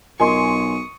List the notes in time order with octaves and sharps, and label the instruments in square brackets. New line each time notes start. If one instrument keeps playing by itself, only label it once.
[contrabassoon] B1 [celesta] F4 A#4 D#5 [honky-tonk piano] G#5 C6 [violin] C#6 D#6